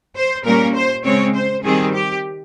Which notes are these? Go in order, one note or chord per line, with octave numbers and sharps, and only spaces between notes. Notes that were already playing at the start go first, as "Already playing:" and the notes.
C5
A#2 G3 A#3 C#4 A#4
C5
C#3 G#3 C4 C#5
C5
D#3 G3 C4 G#4
G4